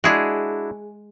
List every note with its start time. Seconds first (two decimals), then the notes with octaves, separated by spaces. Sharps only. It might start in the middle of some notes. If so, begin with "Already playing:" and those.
0.04 G#3 D4 E4 F#4 G#4